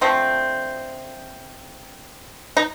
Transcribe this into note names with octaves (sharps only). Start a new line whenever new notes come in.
D3 F3 A3 C4
D#4